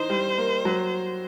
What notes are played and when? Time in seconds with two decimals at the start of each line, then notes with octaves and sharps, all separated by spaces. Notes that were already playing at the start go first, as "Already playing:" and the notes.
Already playing: E3 D#4 C5
0.10 G3
0.38 A#3
0.65 F#3